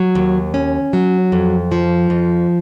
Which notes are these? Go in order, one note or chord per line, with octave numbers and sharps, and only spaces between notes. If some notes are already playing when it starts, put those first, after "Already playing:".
Already playing: F#3
D#2
C#4
F#3
F2
F3
F2